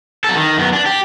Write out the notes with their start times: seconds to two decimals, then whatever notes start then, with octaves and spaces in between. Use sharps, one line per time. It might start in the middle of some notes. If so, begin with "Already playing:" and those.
0.24 F#3 A4
0.36 D#3
0.57 F#2 B3
0.73 D4
0.86 G4